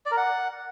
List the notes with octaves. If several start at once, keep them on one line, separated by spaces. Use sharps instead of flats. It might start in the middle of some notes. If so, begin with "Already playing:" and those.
D5
A#4
F#5